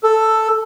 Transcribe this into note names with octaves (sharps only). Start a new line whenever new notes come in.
A4